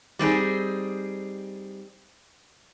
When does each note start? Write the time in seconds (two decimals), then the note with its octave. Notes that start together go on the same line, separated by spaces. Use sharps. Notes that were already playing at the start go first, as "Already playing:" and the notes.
0.19 G3 C4 D#4 G#4